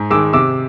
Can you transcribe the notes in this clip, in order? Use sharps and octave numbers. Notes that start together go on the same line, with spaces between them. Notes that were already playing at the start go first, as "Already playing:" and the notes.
Already playing: G#2
D#3 G#3 D6 E6
C3 D6 E6